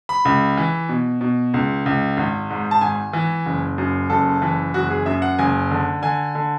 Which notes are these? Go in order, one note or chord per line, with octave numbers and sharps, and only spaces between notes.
B5
C#2
E3
B2
B2
C#2
C#2
G#1
G#2
A5
G#1 G#5
E3
F#1
F#2
F#1 A4
E3
F#1 F#4
G#4
F#2 E5
F#5
F#1 G#5
D3
D3 G#5
D3